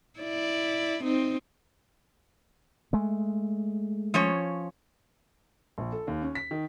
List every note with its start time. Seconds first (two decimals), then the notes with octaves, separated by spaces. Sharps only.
0.20 E4 D5
1.04 C4 D#4
2.93 G#3 A3
4.14 F3 C#4 C#5
5.78 A#1
5.92 A4
6.07 D#2
6.22 C#4
6.35 B6
6.51 D#3